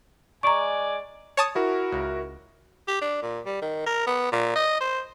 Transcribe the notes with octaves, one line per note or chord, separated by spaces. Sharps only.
G#3 D5 G#5 A#5 C#6
C#5 A5 D#6
E4 F#4 A#4
C#2
G4
D4
A#2
G3
D#3
A#4
B3
A#2
D#5
C5